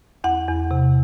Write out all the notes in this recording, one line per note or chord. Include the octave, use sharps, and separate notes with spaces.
E2 F#5
E2
C3